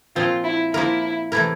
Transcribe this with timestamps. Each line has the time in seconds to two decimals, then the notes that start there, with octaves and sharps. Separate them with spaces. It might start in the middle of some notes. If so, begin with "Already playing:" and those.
0.16 A#2 F3 C4 F4
0.44 E4
0.74 F3 A#3 E4 F4 A#4
1.32 C3 E3 A3 E4 A#4